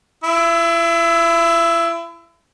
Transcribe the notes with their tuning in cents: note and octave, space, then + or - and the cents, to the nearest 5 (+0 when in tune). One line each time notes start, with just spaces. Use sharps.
E4 +35 E6 +0